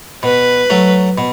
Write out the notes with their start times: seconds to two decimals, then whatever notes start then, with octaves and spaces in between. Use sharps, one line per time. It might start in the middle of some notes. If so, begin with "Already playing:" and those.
0.23 B2 B4
0.70 F#3 A3
1.18 B2